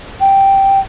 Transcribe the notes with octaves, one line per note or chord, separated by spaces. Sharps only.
G5